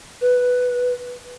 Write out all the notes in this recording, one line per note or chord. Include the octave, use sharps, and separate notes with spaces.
B4